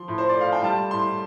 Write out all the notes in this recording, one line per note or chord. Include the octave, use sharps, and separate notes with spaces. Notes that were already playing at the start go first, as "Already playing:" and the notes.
Already playing: F3 C6
A2
C5
D5
A3 F5
G5
G3 A5
A2 C6